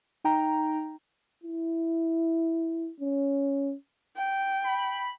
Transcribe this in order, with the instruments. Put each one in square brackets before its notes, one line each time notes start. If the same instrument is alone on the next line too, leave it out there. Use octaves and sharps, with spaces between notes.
[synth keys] D#4 G5 A#5
[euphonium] E4
C#4
[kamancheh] G5
[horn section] B5